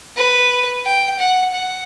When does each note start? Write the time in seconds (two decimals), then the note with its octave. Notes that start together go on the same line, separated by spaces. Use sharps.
0.17 B4
0.84 G5
1.19 F#5
1.54 F#5